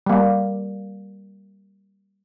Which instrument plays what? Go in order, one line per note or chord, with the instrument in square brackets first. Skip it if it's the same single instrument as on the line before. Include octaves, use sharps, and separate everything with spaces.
[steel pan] G3 A#3